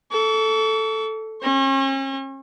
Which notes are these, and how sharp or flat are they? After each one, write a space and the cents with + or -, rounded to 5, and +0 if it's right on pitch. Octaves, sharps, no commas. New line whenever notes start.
A4 +0 C#6 +45
C#4 -40 C#6 -40